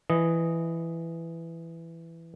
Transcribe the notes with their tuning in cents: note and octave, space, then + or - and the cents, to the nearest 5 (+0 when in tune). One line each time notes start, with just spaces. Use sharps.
E3 +10 D#5 +0